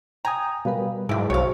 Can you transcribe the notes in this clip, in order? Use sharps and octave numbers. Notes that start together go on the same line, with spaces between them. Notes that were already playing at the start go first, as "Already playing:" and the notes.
G5 G#5 A#5 D#6
B2 G3 A#4 B4 F5
G#2 F#3 E4 G4 G#4
B1 F#4 C5 C#5 F5